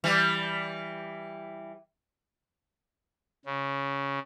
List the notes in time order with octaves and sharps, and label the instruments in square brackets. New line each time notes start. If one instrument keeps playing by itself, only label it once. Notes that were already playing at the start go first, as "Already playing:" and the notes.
[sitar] E3 G3
[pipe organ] C#3